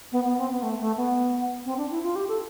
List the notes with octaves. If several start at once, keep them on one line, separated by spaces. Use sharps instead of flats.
B3
B3
C4
B3
A3
A3
B3
C4
D4
E4
F4
G4
A4